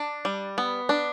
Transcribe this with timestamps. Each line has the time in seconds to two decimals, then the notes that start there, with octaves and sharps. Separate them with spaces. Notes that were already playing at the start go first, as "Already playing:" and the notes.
Already playing: D4 A5
0.25 G3
0.58 B3
0.89 D4